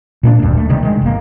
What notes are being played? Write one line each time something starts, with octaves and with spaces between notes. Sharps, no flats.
A#2 A#3 D4
F1 D2 G2
A3
C3 D#3 G3
D#3 G#3
G1 A#3